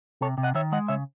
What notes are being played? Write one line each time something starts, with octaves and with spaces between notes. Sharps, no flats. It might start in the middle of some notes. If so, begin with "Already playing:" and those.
C3 A4 C#5
C3
D#5 F#5
D#3 C#5 E5
G#3 D#5 F#5
C#3 C#5 E5